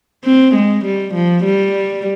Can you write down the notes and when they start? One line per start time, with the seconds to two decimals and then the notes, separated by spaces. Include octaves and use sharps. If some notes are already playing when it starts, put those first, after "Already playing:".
0.24 C4
0.55 G#3
0.85 G3
1.14 F3
1.44 G3